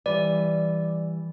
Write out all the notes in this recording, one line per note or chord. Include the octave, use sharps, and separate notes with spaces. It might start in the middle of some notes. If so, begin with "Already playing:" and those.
E3 G3 B4 D5